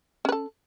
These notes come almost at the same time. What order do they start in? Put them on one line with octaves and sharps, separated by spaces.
C#4 B4 A4